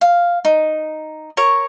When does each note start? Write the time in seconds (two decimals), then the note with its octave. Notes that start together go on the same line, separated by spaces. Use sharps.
0.01 F5
0.45 D#4
1.37 A#4 C#5 C#6